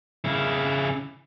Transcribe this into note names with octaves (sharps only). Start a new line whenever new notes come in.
C#3 E4